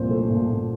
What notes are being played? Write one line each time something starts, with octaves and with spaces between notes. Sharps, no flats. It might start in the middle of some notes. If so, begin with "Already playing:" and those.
Already playing: C2 A#2 F3 C5
A3
A#2
A#2